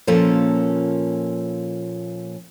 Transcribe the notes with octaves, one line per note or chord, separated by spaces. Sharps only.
A#2 F3 A#3 C#4 A4